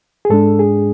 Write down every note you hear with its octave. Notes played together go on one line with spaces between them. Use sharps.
G#4
G#2 G#3 D4 A4
G#4